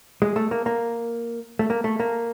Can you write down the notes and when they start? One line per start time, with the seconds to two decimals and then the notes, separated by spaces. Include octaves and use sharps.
0.22 G#3
0.36 A3
0.51 A#3
0.66 A#3
1.59 A3
1.70 A#3
1.84 A3
2.00 A#3